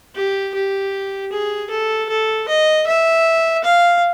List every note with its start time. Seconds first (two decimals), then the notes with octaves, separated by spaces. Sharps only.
0.15 G4
0.54 G4
1.32 G#4
1.70 A4
2.09 A4
2.48 D#5
2.87 E5
3.64 F5